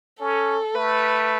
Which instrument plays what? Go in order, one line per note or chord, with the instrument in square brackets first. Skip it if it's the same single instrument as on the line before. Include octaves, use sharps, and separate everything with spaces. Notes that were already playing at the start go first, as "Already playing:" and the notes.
[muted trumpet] C#4 [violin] A4
[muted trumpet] A3 [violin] B4